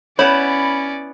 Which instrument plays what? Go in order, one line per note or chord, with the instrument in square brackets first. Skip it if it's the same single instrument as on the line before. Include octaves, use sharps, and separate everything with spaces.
[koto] B3 E4 [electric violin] C#4 D5 [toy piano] C#5 [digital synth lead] B5